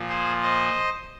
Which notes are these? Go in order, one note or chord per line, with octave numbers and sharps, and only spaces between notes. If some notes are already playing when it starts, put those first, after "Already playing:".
Already playing: A#2 F3
G#4 C5
C5 D#5